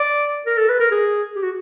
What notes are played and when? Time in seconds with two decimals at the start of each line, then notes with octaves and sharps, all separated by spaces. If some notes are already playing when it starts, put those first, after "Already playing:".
Already playing: D5
0.46 A#4
0.57 A4
0.69 B4
0.80 A#4
0.91 G#4
1.36 G4
1.43 F#4